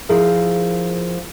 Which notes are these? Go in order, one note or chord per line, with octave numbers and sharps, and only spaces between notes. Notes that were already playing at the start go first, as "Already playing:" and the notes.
F3 E4 G#4 A#4